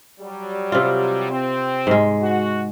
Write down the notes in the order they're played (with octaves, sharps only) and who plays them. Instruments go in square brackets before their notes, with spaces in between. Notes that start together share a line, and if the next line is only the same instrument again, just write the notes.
[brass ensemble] F#3 G3
[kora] C3 F4
[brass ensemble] C4
[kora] G#2 G#3
[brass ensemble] F#4